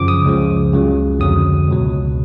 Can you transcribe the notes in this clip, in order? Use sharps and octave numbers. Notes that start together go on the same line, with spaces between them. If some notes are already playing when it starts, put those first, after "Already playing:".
Already playing: F#2 C#3 F3 D6
D#6
C#2 C#3 F3
C#2 C#3 F#3
F2 D3 F#3 D#6
C#2 B2 F#3